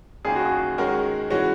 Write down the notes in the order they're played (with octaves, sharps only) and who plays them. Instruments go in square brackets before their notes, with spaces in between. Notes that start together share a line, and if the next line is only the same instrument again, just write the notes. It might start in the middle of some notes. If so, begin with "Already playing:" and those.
[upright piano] F#2 D#3 A#3 [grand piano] G#4
[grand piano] F#4
G#4
[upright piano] D#3 G#3 C#4 F#4 A#4
[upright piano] E3 G#3 C#4 [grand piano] F#4